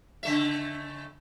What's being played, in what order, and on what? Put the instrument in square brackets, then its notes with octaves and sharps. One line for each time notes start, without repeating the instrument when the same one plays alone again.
[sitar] C#3 A3 E5